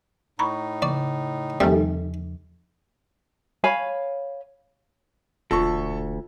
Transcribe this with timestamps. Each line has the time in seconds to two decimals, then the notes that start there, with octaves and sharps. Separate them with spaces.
0.39 A2 D#4 A#5 B5 C#6
0.82 C#3 D5
1.60 E2 C3 D#3 F3 G3 A3 G#5
3.64 C#5 F5 G#5 B5
5.51 E1 D2 F4 A4 C#6